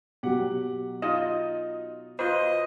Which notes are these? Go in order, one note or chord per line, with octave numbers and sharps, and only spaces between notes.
B2 F#3 G4 F#5
D#4 F4 D#5
F4 B4 C5 D#5